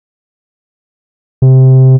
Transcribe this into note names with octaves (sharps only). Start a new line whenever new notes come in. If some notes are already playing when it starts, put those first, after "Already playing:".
C3